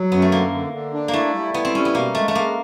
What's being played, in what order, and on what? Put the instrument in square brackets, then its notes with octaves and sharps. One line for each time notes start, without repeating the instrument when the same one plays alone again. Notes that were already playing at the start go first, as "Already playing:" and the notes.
Already playing: [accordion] F#3
[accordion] F#2 [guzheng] B3
[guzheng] A3
[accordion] D3 [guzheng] A#3
[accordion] D3
D3
D4
[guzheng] A#3
[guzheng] A3 [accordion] E4
[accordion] G3
[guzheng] B3 [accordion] E4
[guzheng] C4
[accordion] G3 [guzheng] C#4
[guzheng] B3
[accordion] B2 [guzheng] A#3
[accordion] G#3 [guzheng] A3
[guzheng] A3
[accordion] G#3 [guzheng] A#3